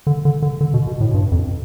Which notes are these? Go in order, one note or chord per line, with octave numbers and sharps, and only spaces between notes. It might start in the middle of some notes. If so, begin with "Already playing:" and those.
D3
D3
D3
D3
B2
B2
A2
G2
F2